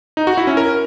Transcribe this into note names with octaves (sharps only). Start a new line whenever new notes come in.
D#4
F#4
E4
C#4
A#4